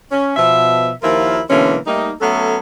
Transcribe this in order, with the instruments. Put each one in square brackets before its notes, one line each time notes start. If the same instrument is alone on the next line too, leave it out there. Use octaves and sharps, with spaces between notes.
[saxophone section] C#4
B2 F3 E5
D#2 F3 E4 F4 A#4
B2 D3 E3 G#3 A#3 C#4
G3 A3 A#3 D#4
F#3 A3 B3 C#4 A4